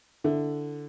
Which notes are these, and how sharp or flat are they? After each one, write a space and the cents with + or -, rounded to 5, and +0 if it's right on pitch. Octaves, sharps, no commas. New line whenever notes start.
D3 +0 E4 +0